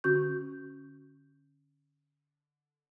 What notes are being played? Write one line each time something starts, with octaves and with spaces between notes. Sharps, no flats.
D3 C#4 F#4 C#6 G6